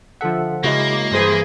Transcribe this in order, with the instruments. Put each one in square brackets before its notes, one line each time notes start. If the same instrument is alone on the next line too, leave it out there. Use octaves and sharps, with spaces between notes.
[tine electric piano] D3 A4 F#5 [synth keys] F3 E5
[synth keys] C#3 D6 [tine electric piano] G#3 E4 F#4 [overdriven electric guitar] A#3
[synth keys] G2 C5 D#6 [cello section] E3 G#4